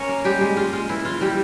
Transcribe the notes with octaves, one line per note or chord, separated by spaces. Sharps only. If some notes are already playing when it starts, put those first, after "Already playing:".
Already playing: C#4 A#4 C#5
A#3
G3 G#3 G4
G#3
G#3 F4
G#3 F4
E3 E4
E3 F4
E3 G3 G4